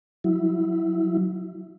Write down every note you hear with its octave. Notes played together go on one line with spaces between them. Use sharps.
F#3 E4